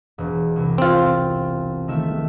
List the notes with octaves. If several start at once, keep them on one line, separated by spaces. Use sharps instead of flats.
E1
C2
C4 F4
D#3 A3 E5